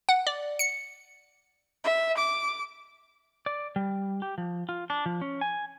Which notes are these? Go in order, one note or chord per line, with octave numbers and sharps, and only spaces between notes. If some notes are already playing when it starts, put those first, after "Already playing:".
F#5
D5
C#7
E5
D6
D5
G3
G4
F3
F4
D4
F3
C#4
G#5